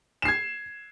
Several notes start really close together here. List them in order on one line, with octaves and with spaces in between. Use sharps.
E7 C7 G#6